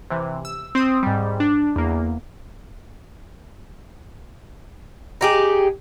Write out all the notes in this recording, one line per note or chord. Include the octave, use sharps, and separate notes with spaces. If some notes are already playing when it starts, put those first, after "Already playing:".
C3 E3
E6
C4 C5 D#6
G#2 G3
D4
E2 A#3
D#4 G4 G#4